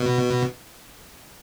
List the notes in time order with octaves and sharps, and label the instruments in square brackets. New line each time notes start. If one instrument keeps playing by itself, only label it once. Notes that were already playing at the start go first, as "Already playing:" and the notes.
Already playing: [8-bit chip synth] B2